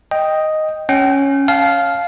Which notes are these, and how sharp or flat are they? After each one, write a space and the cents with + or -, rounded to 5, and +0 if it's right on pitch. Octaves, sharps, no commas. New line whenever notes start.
D#5 +0 G5 +0
C#4 +0 G5 -40
F5 +0 A5 -35